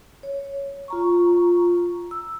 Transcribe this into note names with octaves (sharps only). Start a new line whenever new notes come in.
C#5
F4 A#5 C#6
E6